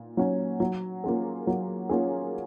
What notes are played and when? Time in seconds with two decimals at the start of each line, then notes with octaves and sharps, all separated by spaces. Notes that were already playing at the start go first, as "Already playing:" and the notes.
Already playing: A#2
0.17 F#3 C#4
0.60 F#3
1.04 A#3 C#4 F4 G#4
1.47 F#3
1.89 A#3 C#4 F4 G#4